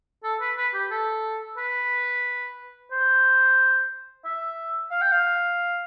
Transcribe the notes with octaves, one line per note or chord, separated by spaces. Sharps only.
A4
B4
B4
G4
A4
B4
C5
E5
F5
G5
F5